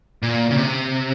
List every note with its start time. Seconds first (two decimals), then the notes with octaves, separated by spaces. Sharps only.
0.22 A#2
0.51 C#3
0.57 C3